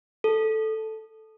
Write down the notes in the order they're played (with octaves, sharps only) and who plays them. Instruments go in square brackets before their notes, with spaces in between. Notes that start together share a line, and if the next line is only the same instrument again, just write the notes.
[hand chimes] A4